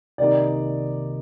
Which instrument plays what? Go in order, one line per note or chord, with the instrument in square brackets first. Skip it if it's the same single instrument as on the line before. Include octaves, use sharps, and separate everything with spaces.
[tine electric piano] C2 C3 D#3 A#3 D#4 [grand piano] D5